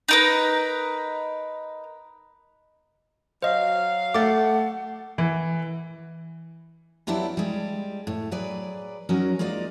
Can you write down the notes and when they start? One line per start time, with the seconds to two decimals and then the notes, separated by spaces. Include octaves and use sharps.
0.09 D#4 A#4 B4
3.42 F#3 C5 D#5 F5
4.14 A3 F#5 D6 A6
5.18 E3
7.07 F#3 B3 D4 E4 F4 G4
7.37 G3 G#3
8.07 A2
8.31 F#3 G#4 B4 D5
9.09 F#3 C#4 D#4 F#4 A#4
9.39 G#3 A#3 D#4 F4 D5